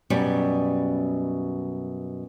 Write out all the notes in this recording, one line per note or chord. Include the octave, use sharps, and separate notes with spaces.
F#2 B2 G3